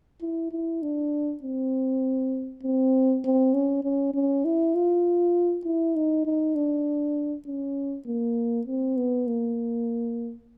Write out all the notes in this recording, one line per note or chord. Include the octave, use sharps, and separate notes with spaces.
E4
E4
D4
C4
C4
C4
C#4
C#4
C#4
E4
F4
E4
D#4
D#4
D4
C#4
A#3
C4
B3
A#3